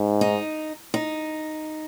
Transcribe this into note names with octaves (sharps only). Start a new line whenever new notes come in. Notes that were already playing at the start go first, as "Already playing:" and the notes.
Already playing: G#2
D#4
D#4